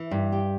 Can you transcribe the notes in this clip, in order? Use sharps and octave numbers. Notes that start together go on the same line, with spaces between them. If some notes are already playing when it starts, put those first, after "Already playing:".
Already playing: E3
G2
G4